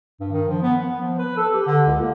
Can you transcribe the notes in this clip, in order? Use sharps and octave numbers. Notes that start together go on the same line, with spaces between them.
G2
D#3
F3
B3
B3
F3
B4
A4
G4
D3
C#2
A#3